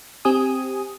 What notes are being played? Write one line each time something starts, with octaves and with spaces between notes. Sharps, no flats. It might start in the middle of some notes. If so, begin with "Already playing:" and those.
C4 G4 G#5 D#6